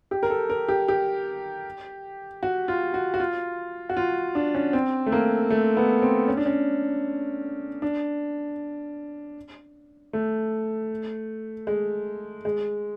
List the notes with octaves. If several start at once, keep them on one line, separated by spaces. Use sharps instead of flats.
G4
A#4
A4
A#4
G4
G4
F#4
F4
F#4
F#4
F4
F#4
F4
D4
C#4
C4
A3
A#3
A3
B3
C4
C#4
D4
C#4
D4
A3
G#3
G#3